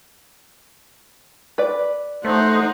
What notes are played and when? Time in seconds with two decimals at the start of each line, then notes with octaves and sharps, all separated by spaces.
1.58 B4 D5
2.25 A3 D#4 C5 F#5